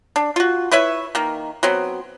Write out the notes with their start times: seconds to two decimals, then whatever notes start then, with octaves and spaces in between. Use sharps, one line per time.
0.16 D4
0.36 F4 F#4
0.71 E4 B4 C#5 E5
1.15 D#3 A#3
1.63 F#3 B3 C4